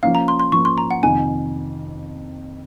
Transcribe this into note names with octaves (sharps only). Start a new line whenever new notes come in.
F3 A#3 C#4 F5
A#5
C6
C6
F3 A#3 C#4 C#6
C6
A#5
F#5
F2 C3 D#3 G#5